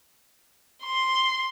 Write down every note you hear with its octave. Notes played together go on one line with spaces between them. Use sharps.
C6